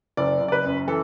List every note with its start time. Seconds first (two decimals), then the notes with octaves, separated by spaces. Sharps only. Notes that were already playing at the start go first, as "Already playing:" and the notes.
0.17 F#1 D5
0.41 F#1
0.48 D5
0.52 B4
0.64 F#2
0.87 E3 A4